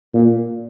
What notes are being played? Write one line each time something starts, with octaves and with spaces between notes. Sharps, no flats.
A#2